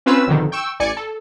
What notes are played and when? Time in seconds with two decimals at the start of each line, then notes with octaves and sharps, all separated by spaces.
0.06 C4 C#4 F4 B4 E6
0.27 G#1 F2 B2 D3 D#3
0.52 G5 C#6 E6
0.80 A1 D5 G#5 C#7
0.97 A4